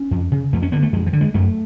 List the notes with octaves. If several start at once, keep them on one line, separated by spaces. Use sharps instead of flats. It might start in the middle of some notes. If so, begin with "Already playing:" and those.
Already playing: C#4
F2
C#3
F2 A3
C#4
D3 B3
A3
F2 G#3
F3
D3
G#3
F#2 A3